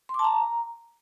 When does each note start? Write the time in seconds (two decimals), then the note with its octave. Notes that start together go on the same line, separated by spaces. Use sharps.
0.09 C6
0.14 D6
0.19 A5
0.24 A#5